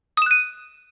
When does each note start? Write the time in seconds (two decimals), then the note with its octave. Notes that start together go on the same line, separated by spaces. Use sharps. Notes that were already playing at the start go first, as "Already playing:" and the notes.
0.17 D#6
0.22 E7
0.26 F#6
0.31 D#7